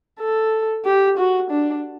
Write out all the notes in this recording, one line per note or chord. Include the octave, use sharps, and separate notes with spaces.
A4
G4
F#4
D4